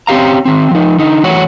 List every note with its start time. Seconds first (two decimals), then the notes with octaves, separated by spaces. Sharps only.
0.07 C4 C#4 G4 F5 A#5
0.45 D#3 C4
0.71 F3 D#4
0.98 D3 D#4
1.24 E3 A3 F#4 C#5